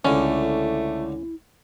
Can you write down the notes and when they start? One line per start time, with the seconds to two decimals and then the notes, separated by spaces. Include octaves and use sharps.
0.05 C#2 D3 A3 C#4 E4